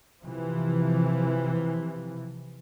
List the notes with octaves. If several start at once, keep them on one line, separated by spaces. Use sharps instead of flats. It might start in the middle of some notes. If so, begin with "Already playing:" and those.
C3 E3 F3